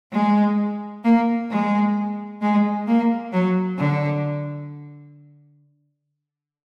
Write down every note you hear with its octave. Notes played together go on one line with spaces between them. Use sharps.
G#3
A#3
G#3
G#3
A#3
F#3
D3